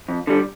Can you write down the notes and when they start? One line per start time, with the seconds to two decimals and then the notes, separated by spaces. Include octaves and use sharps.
0.08 F2
0.27 D3 G3